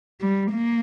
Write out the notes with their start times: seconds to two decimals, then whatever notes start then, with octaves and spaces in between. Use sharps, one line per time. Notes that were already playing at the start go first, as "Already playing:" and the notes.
0.20 G3
0.52 A#3